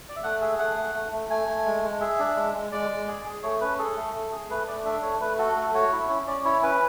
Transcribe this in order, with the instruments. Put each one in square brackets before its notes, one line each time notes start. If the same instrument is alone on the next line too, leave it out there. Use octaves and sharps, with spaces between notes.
[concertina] D5
E5
A3 F#5
G#4 E5
A3 F#5
A3
A3
A3
A3 G#5
A3
G#3
G#3
G#4 E5
D4
G#3
G#3
G#3 D5
G#3
G#4
G#4
A3 C#5
C#4 B4
G#4 A4
A3
A3
G#4
A3 B4
A3 D5
D4 E5
A3 C#5
A3 B4
F#4 A4
A3 A4
F#4 C#5
E4
C#4
C#4 D5
E4 C#5
C#4 B4